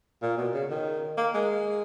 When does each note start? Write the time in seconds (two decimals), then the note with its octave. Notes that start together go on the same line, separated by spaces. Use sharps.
0.22 A#2
0.38 B2
0.54 C#3
0.71 D#3
1.17 A#3
1.34 G#3